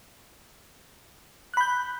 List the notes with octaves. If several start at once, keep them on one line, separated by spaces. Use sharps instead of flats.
B5 F#6 G6